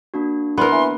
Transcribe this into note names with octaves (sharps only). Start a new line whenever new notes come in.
A#3 D4 F#4
E2 B3 A#4 C6
E3